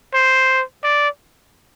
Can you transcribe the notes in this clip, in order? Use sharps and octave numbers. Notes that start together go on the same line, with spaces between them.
C5
D5